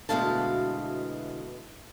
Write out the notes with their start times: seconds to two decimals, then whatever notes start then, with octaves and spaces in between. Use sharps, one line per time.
0.09 D2 B2 E3 G#3 F5 A5